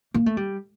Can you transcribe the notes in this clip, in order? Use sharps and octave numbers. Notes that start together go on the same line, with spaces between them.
A#3
A3
G3